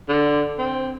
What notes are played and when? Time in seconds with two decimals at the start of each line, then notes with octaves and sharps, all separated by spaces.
0.09 D3
0.59 C4